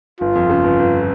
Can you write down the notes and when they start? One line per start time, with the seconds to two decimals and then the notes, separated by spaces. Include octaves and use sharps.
0.21 G1 F4
0.35 F2
0.49 C#3
0.64 G1
0.79 G1